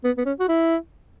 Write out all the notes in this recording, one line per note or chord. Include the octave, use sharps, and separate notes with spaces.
B3
B3
C#4
F#4
E4